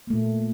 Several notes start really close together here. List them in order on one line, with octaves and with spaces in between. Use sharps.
A#3 A3 A#2